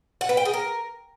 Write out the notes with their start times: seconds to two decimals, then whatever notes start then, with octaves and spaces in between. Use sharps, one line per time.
0.21 F#5
0.29 B4
0.37 G5
0.45 G#4
0.54 A#4